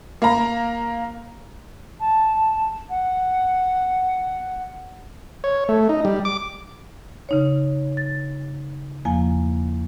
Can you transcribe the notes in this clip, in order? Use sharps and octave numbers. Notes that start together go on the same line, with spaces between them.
A#3 A#5
A5
F#5
C#5
A3
D#4
G3
D6
C#3 D#4 C#5
A6
E2 F3 A#3 G#5